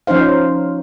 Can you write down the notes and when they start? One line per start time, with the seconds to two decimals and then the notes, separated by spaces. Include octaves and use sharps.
0.07 F3 C#4 D#4 C5 F5